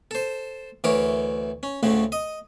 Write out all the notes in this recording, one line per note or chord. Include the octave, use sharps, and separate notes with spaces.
A4 C5
D2 E3 A#4 C#5 D6
C#4
D2 A2 C#3 A3 F#5
D#5